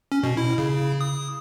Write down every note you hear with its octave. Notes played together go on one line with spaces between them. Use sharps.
C#4
B2
E4
C#3
D#6